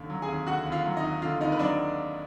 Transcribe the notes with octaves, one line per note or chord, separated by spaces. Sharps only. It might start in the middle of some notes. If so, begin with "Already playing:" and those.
Already playing: D#2 D3
F#3
G#4 G#5
D#2
D3 F#4 F#5
D#2
F4 F5
F#3
D#4 D#5
D#2
D3 F4 F5
D#2 D#4 D#5
B4
F#3 D4 D5